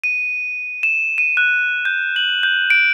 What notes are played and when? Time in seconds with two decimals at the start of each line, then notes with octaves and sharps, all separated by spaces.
0.04 D#7
0.83 E7
1.18 D#7
1.37 F#6
1.85 G6
2.16 F#7
2.43 G6
2.70 D7